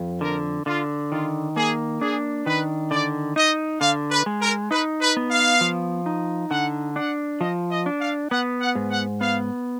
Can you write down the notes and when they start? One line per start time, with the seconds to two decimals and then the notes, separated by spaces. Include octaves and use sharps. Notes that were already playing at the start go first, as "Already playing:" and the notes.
Already playing: F2
0.21 D3 A#4
0.66 D3 F4
1.11 D#3 F4
1.56 A#3 G#4
2.01 D4 G#4
2.46 D#3 B4
2.91 D3 D5
3.36 D#4 D#5
3.81 D3 F5
4.11 B4
4.26 G#3
4.41 A#4
4.71 D#4 B4
5.01 B4
5.17 B3
5.31 F5
5.61 F3
6.06 D#4
6.51 D3 F#5
6.96 D4 F#5
7.40 F3 D#5
7.71 D#5
7.86 D4
8.01 F5
8.31 B3 F#5
8.61 F#5
8.75 G#2
8.91 F#5
9.21 B3 F5